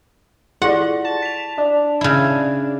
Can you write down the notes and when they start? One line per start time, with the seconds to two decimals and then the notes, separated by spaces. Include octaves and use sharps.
0.62 E4 F4 D5 F#5
1.04 A5
1.22 B6 F7
1.58 D4
2.01 C#3 E4